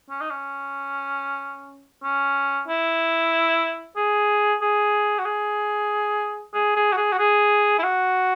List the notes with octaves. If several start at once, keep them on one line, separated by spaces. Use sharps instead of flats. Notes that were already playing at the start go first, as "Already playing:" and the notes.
C#4
D#4
C#4
C#4
E4
G#4
G#4
F#4
G#4
G#4
G#4
F#4
G#4
F#4
G#4
E4
F#4